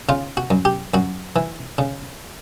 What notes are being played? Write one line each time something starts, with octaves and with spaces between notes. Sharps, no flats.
C#3 F4
F#4
F#2
G4
F#2 F#4
E3
C#3